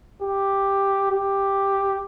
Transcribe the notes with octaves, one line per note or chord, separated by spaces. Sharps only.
G4
G4